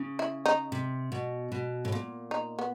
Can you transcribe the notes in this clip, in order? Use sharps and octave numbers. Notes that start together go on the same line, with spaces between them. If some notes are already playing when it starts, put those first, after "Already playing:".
Already playing: C#3
E4
D#4
C3
B2
B2
A2
A#2
D#4
B3